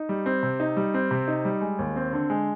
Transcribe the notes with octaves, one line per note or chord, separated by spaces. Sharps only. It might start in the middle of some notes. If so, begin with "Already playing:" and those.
Already playing: D#4
G3
C4
C3
D#4
G3
C4
C3
D#4
G3
G#3
D#2
C4
D3
G#3